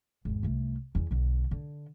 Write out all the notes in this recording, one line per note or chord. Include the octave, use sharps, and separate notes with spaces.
G#1 E2
C2 A3
E2 D#3
B1 D3
D3